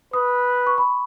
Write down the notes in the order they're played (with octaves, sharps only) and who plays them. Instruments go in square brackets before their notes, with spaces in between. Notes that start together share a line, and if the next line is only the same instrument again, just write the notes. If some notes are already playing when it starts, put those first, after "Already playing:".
[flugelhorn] B4 [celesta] D#6
[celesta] C#6
B5